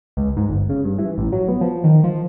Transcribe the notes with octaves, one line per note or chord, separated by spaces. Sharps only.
C#2
G#2
G1
C#3
G2
E3
A1
F#3
B3
F3
D#3
F3